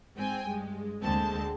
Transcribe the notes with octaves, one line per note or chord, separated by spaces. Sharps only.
G#2 C4 G5 G#5
G2 G#3
D2 D3 G#3 A#3 C4 A5